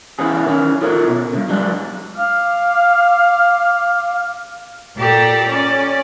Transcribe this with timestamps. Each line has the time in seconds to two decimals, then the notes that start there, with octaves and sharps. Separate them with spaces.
0.19 E3 B3 C#4 G#4
0.46 D#3 C#4
0.81 F4 A4 A#4 C#5
1.08 B2
1.33 G2 C3
1.49 F#3 G#3 D4
2.15 F5 D6 F6
4.96 A#2 G4 A4 D5 A#5 E6
5.47 C#4 D5